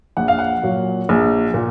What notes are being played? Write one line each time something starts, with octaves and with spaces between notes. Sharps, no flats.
A#1 F#5
F5
F#5
A#2 F#3
A#1
A#2